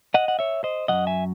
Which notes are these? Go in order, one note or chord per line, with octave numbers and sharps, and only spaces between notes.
D#5 F#5
F#5
C#5 E5
C5 D#5
F#2 C#3 F#3 D#5 F#5
E5 G#5